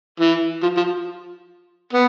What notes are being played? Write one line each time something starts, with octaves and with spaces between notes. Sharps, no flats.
E3
F3
F3
B3